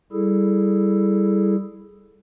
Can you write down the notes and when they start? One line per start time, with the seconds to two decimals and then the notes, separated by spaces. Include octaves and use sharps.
0.12 G3 E4 G#4 A4